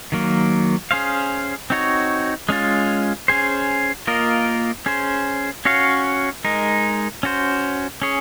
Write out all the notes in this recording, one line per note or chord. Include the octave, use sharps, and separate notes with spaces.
D#3 F#3 A#3
C#4 G#4 C5 F5
C4 D#4 F#4 C#5
G#3 C#4 F4
C#4 G#4 C5
A#3 F4 A#4 D#5
C#4 G#4 C5
C#4 F#4 C#5 F5
G#3 D#4 A#4
C#4 F#4 C5
C#4 G#4 C#5